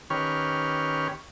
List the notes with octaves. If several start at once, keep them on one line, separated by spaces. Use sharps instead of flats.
D#3 C#4 G4 B4 C#5 F6